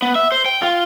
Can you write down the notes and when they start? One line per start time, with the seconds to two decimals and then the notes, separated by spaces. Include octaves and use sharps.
0.02 B3
0.15 E5
0.32 C5
0.46 G5
0.62 F4